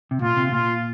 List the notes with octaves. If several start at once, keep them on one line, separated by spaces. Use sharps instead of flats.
C3
A#2 F4
C3
A#2 F4